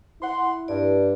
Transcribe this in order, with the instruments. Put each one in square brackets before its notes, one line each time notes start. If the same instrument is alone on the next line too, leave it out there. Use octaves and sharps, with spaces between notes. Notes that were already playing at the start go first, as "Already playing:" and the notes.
[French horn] E4 [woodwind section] F#5 C6
[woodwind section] G2 [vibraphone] D5